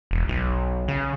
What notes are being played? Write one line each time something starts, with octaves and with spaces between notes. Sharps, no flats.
E1
B1
C#3